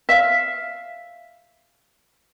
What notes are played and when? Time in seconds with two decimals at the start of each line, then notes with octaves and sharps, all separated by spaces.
0.09 E5 F5